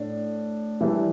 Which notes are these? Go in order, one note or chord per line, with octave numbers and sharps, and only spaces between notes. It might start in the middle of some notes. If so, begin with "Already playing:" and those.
Already playing: A2 D4
E3 G3 D4 E4 E5